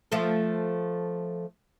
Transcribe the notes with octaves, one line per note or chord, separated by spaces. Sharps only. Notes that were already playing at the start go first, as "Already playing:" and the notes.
F3 A3 A4